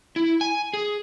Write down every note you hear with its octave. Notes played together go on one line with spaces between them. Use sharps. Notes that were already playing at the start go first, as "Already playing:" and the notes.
E4
G#5
G#4